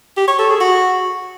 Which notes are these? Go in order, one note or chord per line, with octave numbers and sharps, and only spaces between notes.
G4
C#5
A4
G#4
F#4